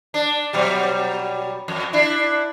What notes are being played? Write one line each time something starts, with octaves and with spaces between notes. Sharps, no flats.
D4
B2 F#3 G3
F2
D4 E4